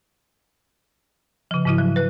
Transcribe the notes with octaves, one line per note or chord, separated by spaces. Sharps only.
C#3 F3
G#2 C#3 F3 E4
F#3
B4 F#6